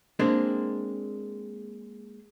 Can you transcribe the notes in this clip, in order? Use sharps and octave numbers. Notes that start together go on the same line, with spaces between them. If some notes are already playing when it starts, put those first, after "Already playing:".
G#3 A#3 C4 D4